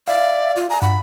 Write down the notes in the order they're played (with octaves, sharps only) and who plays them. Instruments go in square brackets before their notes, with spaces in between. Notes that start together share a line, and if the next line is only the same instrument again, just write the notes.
[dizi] D5 [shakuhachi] E5 [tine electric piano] F5
[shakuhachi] F4
[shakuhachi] G#5 [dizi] A#5
[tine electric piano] G2 [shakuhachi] F#5 [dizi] B5